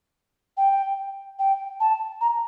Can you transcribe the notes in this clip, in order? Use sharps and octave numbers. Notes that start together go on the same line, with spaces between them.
G5
G5
A5
A#5